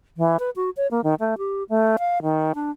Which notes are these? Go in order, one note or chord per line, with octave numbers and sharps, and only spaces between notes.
E3
B4
F#4
C#5
A#3
D#3
A3
G4
A3
F5
D#3
D4